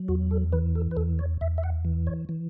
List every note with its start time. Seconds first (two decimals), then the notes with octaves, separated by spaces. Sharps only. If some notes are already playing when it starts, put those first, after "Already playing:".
Already playing: F#3
0.08 E2 F#4
0.31 A4
0.53 E3 B4
0.75 A4
0.91 B4
0.97 E2 A4
1.19 C#5
1.41 E2 E5
1.58 E5
1.64 F#5
1.85 E3
2.07 C#5
2.29 E3